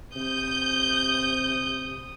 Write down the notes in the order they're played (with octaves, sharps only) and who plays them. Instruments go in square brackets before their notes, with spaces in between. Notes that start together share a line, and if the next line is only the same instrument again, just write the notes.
[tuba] C3 [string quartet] D#6 [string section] G6